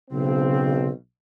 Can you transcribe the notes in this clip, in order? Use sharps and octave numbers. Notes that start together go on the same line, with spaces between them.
B1 C#3 C4